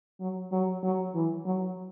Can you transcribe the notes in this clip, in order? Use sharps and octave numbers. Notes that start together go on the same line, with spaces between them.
F#3
F#3
F#3
E3
F#3